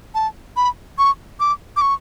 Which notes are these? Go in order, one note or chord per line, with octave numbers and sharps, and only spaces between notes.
A5
B5
C#6
D6
D6
C#6